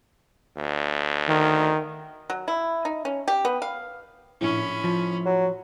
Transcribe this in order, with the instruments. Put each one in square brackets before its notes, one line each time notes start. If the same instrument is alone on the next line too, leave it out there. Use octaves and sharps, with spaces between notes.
[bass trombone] D2
[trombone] D#3
[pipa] F#3
E4
D#4
C#4
G4
B3
F5
[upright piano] A#1 A2 [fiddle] C#4 B5
[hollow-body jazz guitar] F3
[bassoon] F#3